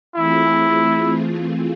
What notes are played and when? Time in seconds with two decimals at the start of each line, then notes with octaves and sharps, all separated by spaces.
0.15 E3 A3 C4 E4 F4 G#4